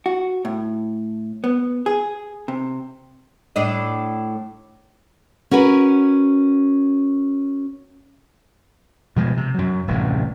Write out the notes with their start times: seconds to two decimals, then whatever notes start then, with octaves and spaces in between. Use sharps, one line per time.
0.06 F#4
0.45 A2
1.44 B3
1.86 G#4
2.48 C3
3.56 A2 D4 D#5
5.51 C#4 F#4 A#4 B4
9.16 B2 F3 G#3
9.37 C3
9.54 F#2 F#3
9.87 D1 A1 G2 C3